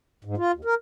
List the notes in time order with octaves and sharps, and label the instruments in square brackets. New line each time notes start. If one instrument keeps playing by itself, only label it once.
[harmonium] G#2
F4
D#2
A#4